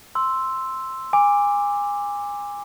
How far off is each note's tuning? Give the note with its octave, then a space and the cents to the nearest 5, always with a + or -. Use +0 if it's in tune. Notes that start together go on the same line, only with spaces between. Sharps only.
C6 +0 E6 +0
G#5 -25 D6 +0